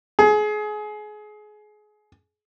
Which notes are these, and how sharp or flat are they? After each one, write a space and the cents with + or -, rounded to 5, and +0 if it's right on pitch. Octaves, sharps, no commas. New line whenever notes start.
G#4 +25